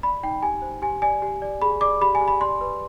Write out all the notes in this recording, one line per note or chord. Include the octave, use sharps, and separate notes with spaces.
D5 B5
D#4 G5
G4 G#5
C5
G4 G#5
D5 G#5
G4
D5
G#4 B5
D5 D6
G4 B5
G#5
G4
B5
D5 C6
B4